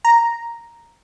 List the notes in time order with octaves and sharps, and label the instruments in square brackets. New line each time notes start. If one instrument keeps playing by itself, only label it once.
[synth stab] A#5